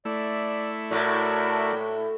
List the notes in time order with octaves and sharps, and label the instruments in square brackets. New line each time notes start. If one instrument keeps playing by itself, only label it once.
[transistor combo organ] A3 E4 [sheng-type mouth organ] D5
[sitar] A2 [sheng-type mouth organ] F#4 A#4 D5